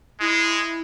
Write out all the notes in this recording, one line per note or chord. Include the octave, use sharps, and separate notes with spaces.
G#3 E4